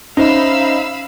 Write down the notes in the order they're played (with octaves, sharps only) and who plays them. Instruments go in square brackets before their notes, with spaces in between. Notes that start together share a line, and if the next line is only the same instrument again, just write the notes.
[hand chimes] C#4 C5 E5 [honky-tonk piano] D#4 [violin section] F5 B5 E6